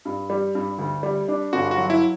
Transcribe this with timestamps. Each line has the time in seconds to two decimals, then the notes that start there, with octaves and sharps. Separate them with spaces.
0.05 G2
0.30 G3
0.55 G2
0.78 D2
1.03 G3
1.28 D4
1.53 G1 F#4
1.71 F#4
1.78 F#3
1.90 E4